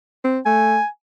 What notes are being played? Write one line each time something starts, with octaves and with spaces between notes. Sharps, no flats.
C4
A3 G#5